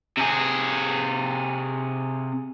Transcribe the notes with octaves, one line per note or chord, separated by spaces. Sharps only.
C3 G#4